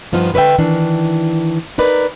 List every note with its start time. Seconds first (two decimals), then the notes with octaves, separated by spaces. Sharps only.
0.12 G2 F3 B3 D#4 F4
0.34 D3 B4 C#5 E5 G5
0.58 D#3 E3 D4
1.78 D#4 A#4 B4 D5